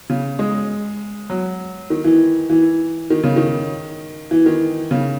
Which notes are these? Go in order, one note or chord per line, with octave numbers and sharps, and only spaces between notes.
C#3
G#3
F#3
D#3
E3
E3
D#3
C#3
D#3
E3
D#3
C#3